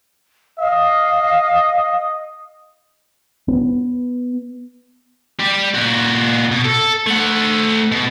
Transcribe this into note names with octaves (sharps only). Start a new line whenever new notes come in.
D#5 F5
B3
G3 G4
A#2 F#4
B2
A4
A3 F#5
B2